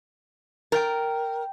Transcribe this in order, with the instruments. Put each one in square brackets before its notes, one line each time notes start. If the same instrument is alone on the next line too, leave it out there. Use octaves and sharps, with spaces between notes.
[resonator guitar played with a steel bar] A#4 [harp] G5 G6 A6